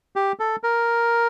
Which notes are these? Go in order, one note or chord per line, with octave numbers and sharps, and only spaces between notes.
G4
A4
A#4